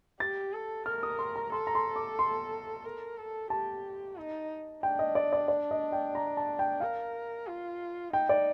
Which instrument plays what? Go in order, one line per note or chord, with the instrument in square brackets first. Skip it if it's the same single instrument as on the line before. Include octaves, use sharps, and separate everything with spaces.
[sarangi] G4 [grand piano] A6
[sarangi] A4
[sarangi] A#4 [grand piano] F6
[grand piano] D#6
C6
A#5
[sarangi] A4 [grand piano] C6
[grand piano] A#5
C6
D6
C6
[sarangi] A#4
A4
[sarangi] G4 [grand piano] A5
[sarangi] D#4
[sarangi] D4 [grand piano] G5
[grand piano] D#5
D5
D5
D5
D#5
G5
A#5
A5
G5
[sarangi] A#4 [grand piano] F5
[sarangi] F4
[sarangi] D#4 [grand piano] G5
[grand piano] D5